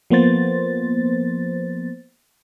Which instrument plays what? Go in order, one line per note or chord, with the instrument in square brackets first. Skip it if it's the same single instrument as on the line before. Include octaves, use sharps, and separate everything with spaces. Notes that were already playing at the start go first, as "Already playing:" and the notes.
[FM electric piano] F3 A#3 B3 C5 A6